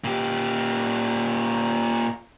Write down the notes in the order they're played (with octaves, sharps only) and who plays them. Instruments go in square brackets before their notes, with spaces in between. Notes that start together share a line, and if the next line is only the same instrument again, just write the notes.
[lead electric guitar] A#2 G4